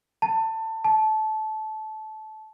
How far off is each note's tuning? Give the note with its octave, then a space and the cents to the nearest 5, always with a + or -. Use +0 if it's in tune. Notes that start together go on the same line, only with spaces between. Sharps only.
A5 +20
A5 -20